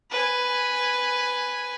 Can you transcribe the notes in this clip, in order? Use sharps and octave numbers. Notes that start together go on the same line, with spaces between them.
B4 G#5